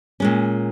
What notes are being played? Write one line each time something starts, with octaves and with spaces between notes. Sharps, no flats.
A#2 G#3 C#4